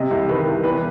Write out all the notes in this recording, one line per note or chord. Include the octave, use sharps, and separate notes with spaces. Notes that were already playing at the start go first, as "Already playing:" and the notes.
Already playing: C3 D#5
C2
D#3 B4
C2
E2 B4